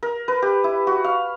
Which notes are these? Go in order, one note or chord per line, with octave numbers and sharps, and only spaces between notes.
A#4
B4
G4
E4
F#4
F5